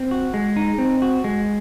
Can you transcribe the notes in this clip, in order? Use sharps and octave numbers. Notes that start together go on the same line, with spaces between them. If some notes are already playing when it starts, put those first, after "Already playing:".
Already playing: C4
F#4
G#3
D#4
C4
F#4
G#3